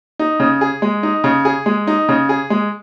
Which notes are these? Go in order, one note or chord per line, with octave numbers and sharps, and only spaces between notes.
D#4
C#3
G#4
G#3
D#4
C#3
G#4
G#3
D#4
C#3
G#4
G#3